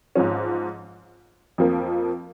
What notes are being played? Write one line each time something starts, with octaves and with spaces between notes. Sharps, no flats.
G#2 F3 C#4
F2 F3 A#3